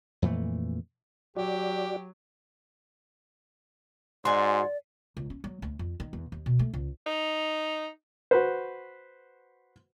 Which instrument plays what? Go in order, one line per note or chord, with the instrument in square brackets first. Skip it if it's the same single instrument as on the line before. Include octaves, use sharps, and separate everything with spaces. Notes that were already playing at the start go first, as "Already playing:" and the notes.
[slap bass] F2 A#2 E3 A3
[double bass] F#3 [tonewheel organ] F#4 D5 [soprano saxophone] G4
[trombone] G#2 [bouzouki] F#4 G#5 [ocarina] D5 [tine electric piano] C6
[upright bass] C#2
C#4
F#3
D2
F2
D#3
E2
D#2
B2
A3
C#2
[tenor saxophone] D#4
[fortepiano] F#4 B4 C5